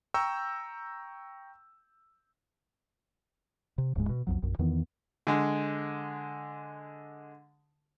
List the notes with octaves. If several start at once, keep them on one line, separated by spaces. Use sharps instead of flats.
G5 A#5 C#6 E6 G6
C3
D1 D2 G#2 G#3
B2
B1 F2 F#3
A#1 F#2
E2 D#3 E3 B3
D3 G#3